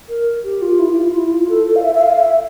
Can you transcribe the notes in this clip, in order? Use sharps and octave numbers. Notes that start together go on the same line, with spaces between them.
A#4
G4
F4
E4
E4
F4
E4
F4
A4
A4
F5
E5
E5
F5
E5